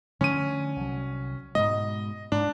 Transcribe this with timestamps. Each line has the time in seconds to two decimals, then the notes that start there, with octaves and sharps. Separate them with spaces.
0.21 D3 F3 A3 C#4 D#7
0.76 C2 F#3
1.55 G#2 B2 G#3 D#5
2.32 G#2 D4